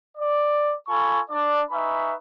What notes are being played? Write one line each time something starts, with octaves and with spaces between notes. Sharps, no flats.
D5
F4 A4 G#5 B5 C#6
D4 D5
D#4 B4 E5 G#5 B5 C#6